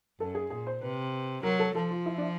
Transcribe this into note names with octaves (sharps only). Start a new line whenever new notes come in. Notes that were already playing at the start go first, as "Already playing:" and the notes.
F#2 A4
G#4
A#2 G#4
C5
C3 B4
F#3 A#4
A4
F3 A4
F4
E4
D4